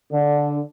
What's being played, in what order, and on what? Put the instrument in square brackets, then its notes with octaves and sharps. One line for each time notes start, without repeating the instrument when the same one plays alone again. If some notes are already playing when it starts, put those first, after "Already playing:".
[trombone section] D3